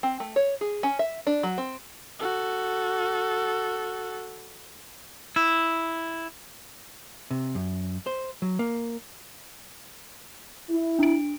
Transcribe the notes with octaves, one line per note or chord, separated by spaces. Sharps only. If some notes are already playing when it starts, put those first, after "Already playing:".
C4
A3
C#5
G#4
C#4
E5
D4
F#3
C4
F#4 A4
E4
C3
F#2
C5
F#3
A#3
E4
D4 D7